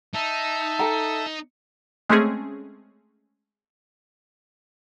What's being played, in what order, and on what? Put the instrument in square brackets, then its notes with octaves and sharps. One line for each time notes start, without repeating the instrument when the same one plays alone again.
[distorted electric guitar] D#4 [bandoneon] E5 A5
[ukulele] A4 G5 A#5
[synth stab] G#3 A3 C4 C#4 G#4